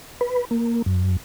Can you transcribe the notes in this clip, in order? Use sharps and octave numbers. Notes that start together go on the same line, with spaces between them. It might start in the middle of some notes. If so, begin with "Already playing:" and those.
B4
A#3
F#2